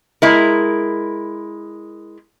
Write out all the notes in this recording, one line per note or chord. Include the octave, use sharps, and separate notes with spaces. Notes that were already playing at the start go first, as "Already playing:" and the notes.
G#3 E4 A#4